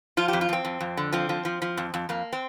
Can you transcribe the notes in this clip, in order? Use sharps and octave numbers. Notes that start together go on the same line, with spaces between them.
F3 F4
F2 G4
F4
F2 C4
F2
F2
D3
F3 C4
F3
F3
F3
F2
F2
F2 A#3
C4